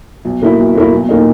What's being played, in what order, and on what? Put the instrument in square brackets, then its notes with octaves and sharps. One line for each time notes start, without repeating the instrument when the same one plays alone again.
[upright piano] B1
B2 A#3 E4
B1
B2 A#3 E4
B1
A#2 A#3 D#4